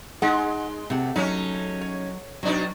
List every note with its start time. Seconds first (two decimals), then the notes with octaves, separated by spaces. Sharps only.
0.22 G#3 D#4 G#4 F#5
0.90 C3 A3 F#5
1.16 F#3 C#4 D#4
1.81 C#5
2.43 B2 F#3 D4 D#4